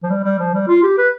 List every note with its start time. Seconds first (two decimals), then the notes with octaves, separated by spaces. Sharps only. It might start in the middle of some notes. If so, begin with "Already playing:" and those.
0.03 F3
0.10 G3
0.24 G3
0.39 F3
0.54 G3
0.68 F4
0.83 G4
0.98 B4